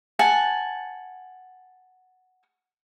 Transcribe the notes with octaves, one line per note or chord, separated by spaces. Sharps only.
F#5 G#5 A5